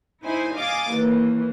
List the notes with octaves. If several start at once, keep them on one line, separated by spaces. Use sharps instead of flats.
D#4 E4 C5 G#5
D#5 F5 G#5 D6 A6
D#2 E3 A#3